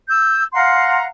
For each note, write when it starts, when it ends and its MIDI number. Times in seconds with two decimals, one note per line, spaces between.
0.08 0.44 88
0.08 0.44 91
0.53 1.03 77
0.53 1.03 78
0.53 1.03 82
0.53 1.03 84